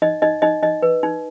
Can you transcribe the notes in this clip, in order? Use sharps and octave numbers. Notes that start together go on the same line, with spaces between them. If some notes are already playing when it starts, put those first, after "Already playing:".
D#4 D#5
D#4 D#5
D#4 D#5
D#4 D#5
B4
D#4